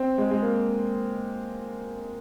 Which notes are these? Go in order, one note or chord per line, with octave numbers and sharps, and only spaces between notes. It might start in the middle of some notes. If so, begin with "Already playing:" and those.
Already playing: C4
G#3
G#3
A#3